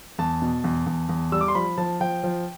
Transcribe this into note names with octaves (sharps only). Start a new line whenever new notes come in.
E2 A5
B2
E2
E2
E2
G3 E6
D6
C6
F3 B5
F3 A5
F3 G5
F3